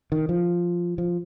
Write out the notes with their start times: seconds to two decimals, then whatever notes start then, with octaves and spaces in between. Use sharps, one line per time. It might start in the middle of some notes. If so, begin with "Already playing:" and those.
0.12 D#3
0.29 F3
0.98 F3